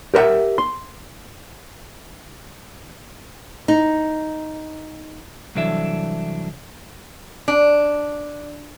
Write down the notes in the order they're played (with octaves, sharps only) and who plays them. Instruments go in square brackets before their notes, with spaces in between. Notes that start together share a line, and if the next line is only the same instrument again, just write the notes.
[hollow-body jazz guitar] G4 A#4 B4 E5 F#5
C6
[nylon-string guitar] D#4
[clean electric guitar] C2 E3 F#3 D4 A4 E5
[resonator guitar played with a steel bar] D4